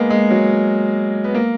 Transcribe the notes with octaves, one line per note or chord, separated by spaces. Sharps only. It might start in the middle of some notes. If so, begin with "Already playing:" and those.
Already playing: G#3 A#3 B3
G#3
F#3
B3
A#3